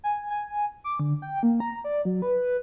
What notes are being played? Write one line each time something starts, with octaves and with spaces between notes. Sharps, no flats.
G#5
G#5
D6
D3
G5
A#3
A#5
D5
F#3
B4